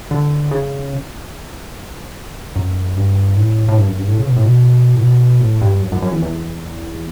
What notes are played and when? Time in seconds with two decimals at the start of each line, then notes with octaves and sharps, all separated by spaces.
0.11 D3
0.51 C#3
2.56 F#2
2.96 G2
3.37 A2
3.68 A2
3.78 G2
3.88 F#2
3.98 G2
4.08 A2
4.18 C#3
4.27 B2
4.36 A2
4.45 B2
4.95 A2
5.00 B2
5.40 A2
5.62 G2
5.82 F#2
5.92 F#2
6.02 F#2
6.12 E2
6.22 E2